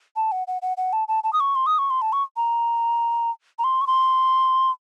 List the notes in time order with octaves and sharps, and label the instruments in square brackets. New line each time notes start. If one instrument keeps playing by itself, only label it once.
[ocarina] A5
F#5
F#5
F#5
F#5
A5
A5
A5
D#6
C#6
C6
D#6
C#6
C6
A5
C#6
A#5
A#5
C6
C#6
C6